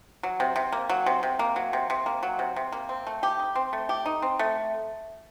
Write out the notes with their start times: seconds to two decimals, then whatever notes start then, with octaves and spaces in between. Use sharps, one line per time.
0.23 F#3
0.40 C3
0.56 C3
0.72 A#3
0.89 F#3
1.06 C3
1.23 C3
1.39 A#3
1.56 F#3
1.73 C3
1.90 C3
2.06 A#3
2.23 F#3
2.39 C3
2.56 C3
2.72 A#3
2.89 C4
3.07 A3
3.23 G4
3.39 D#4
3.55 C4
3.73 A3
3.89 G4
4.06 D#4
4.22 C4
4.39 A3